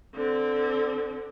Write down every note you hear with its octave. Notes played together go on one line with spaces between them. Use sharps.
D3 C4